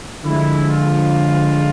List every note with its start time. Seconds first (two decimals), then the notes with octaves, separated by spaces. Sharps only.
0.24 D3 F3 G#3 E4
0.68 F4